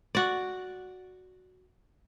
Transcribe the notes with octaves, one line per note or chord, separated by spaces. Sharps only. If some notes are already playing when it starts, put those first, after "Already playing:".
F#4 D5